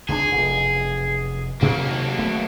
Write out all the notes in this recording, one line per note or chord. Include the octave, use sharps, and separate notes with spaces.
C#2 F#3 D4 G#4
F1 F#2 B2
D2 C3 D#3 F#3 A#3
A3 B3